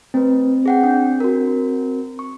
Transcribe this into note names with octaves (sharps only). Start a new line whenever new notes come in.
A3 C4 B4
G#4 F#5 G5
D4
F#4 A#4
C#6